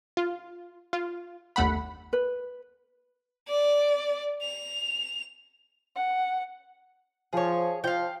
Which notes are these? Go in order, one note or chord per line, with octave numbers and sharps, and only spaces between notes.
F4
F4
G1 D#2 A3 F#5 B5
B4
D5
F7
F#5
F3 G#4 C#5
F3 F5 G5